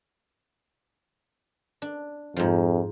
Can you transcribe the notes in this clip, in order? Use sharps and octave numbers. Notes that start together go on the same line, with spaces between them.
D4
F2 G#2 F3